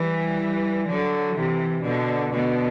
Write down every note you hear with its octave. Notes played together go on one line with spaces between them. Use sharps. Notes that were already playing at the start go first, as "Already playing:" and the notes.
Already playing: E3 G3
D3 F#3
C3 E3
B2 D3
B2 D3